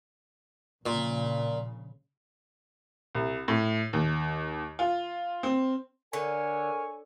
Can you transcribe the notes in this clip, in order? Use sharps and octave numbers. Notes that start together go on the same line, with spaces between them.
A#1 A#2 C#3
C2
A2
D#2
F4
C4
D3 A#4 C#5 G#5